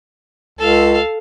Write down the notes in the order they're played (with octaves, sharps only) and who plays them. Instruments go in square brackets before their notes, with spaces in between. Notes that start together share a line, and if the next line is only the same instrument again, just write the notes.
[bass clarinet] C#2 [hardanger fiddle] A4 F5